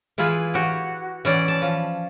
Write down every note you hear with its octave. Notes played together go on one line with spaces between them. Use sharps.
E3 E4 F4 G#4 B4
F#4 G4
E3 C#4 D5
A5
F3